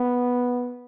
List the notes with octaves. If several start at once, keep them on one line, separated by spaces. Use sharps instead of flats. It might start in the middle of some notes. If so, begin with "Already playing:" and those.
Already playing: B3